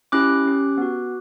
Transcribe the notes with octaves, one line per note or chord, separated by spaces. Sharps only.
C#4 E4 G4 D6 F#6
C#4 G4
B3 F#4